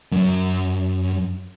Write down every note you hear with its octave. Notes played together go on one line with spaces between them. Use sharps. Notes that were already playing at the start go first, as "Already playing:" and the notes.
F#2